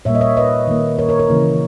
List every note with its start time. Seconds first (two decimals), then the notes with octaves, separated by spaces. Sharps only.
0.05 A#2 G3 A#3 C#5 E5
0.15 D#5
0.21 C#5 E5
0.37 B4 D#5
0.67 D#3 A#3
0.99 A#4 C#5
1.09 A#4 C#5
1.19 A#4 C#5
1.29 C#3 E3 A#3